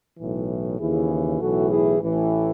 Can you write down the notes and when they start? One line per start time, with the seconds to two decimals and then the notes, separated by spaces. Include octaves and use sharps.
0.18 B1 A2 E3
0.78 D#2 C#3 E3 E4 G#4
1.40 B1 A2 E3 F#4 A4
1.70 E4 G#4
2.00 A1 A2 E3